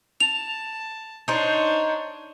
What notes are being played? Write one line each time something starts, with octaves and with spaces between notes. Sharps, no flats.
A5 F7
D4 D#4 C5 C#5